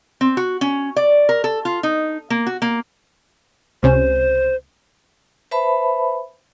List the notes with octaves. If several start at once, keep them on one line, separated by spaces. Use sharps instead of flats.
C4
F#4
C#4
D5
A#4
A4
F4
D#4
A#3
F#4
A#3
C#2 C3 C#4 C5
B4 C5 E5 A5 B5